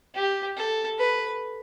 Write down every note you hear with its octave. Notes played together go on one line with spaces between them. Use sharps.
G4
A4
B4